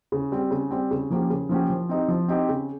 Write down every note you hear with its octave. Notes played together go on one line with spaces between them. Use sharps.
C#3
G3 C4 G4
C#3
G3 C4 G4
C#3
F3 A#3 C#4 G4
C#3
F3 A#3 C#4 G4
F3
C4 D#4 G4
F3
C4 D#4 G4
C#3